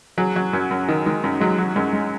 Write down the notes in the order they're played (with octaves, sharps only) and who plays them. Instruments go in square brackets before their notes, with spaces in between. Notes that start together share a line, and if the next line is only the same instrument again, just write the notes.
[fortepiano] F#3 [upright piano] G#4
[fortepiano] F#3
[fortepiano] F#2 [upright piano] F#4
[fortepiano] F#2
[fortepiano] D#3 [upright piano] D#4
[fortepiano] D#3 [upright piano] G#3
[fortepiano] F#2 [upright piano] F#3
[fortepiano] F#3 [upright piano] G#3
[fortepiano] F#3
[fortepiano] F#2 [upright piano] G#3
[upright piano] G#3